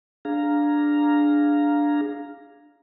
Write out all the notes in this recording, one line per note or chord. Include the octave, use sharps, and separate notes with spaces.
D4 G#4 F5 A#5